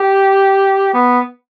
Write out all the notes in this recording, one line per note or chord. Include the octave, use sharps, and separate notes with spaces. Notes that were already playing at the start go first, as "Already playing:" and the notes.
Already playing: G4
B3